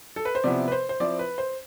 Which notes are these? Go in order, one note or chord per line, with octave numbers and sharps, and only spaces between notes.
A4
B4
C5
C3 F3 B3 E4 D5
B4
C5
C5
F3 C4 E4 D5
B4
C5